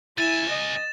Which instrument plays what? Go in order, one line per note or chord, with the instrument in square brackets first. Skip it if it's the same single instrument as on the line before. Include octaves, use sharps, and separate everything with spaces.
[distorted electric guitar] C#2 G#5 [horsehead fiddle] E4 [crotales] A6 E7
[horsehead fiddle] D#5